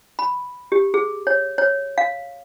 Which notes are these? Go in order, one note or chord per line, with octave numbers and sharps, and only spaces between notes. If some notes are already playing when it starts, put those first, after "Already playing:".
B5
G4
G#4
C#5
C#5
F5